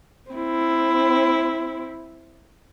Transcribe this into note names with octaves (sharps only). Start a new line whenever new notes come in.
C4 E4